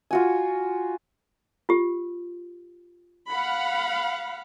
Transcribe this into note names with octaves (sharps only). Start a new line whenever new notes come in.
F4 F#4 G#5
F4 G4
F5 F#5 B5